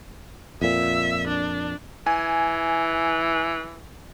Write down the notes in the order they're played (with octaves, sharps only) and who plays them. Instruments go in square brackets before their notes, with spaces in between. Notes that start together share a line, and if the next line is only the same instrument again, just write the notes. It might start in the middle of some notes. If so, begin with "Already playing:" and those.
[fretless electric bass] F2 A#2 [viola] E5
[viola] D4
[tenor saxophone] E3 [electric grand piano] G#5